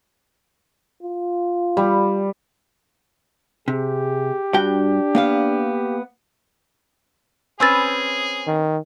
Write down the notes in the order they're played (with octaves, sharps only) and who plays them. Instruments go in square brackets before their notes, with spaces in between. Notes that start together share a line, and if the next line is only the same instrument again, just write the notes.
[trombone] F4
[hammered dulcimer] G3
[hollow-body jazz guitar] C3 [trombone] G4 [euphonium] G#4
[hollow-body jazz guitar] G2 F#4 G5 [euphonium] D4
[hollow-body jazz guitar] A#3 B3 F5
[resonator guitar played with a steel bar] C4 C#4 B4 [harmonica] G#4 [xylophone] G#5 E6 A6
[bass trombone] D#3